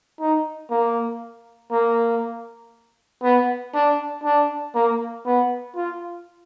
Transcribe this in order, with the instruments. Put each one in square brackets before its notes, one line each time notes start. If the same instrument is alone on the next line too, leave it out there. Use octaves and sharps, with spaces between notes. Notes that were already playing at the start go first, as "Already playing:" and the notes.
[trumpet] D#4
A#3
A#3
B3
D4
D4
A#3
B3
F4